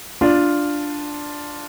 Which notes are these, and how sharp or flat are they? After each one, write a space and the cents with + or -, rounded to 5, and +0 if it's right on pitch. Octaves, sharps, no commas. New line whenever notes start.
D4 +0 F4 +0 D5 +0